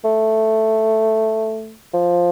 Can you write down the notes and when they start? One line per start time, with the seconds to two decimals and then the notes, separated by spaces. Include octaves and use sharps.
0.04 A3
1.94 F3